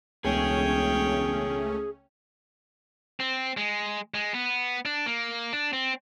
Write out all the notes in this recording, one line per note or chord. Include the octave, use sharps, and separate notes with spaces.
E1 C#2 A3 C#4 G#4 C#5 G5
C4
G#3
G#3
B3
D4
A#3
D4
C4